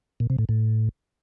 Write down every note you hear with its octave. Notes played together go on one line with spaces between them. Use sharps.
A#2
C3
A2
A2